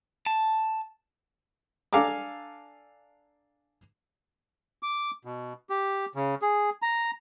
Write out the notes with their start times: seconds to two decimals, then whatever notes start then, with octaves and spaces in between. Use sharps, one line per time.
0.26 A5
1.93 D4 A4 F5 G#5 A#5 D6
4.83 D6
5.25 B2
5.70 G4
6.15 C#3
6.42 G#4
6.82 A#5